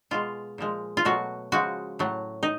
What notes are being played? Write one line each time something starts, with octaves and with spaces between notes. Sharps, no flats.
B2 G#3 F4
A#2 F3 G#3
F4
B2 F#3 A3 F#4
C#3 F3 G#3 F#4
A2 F#3 A3
D#4